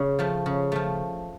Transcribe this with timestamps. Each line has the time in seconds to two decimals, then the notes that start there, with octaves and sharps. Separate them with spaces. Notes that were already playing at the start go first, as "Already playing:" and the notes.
Already playing: C#3
0.19 F3 A3
0.46 C#3
0.72 F3 A3